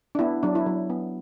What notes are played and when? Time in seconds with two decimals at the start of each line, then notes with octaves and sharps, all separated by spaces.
0.15 D4
0.19 B3 E4
0.43 F#3 D4
0.55 E4
0.66 F#3
0.90 B3